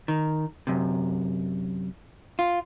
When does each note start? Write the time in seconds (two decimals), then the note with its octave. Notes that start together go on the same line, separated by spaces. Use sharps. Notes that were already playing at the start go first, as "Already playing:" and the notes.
0.08 D#3
0.67 F#2 C3
2.39 F4